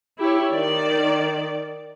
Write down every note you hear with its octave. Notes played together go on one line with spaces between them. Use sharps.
E4 G4 C#5
D#3 D5